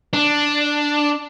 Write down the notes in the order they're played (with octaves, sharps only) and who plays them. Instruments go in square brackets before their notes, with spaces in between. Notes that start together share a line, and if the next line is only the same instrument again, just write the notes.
[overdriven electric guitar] D4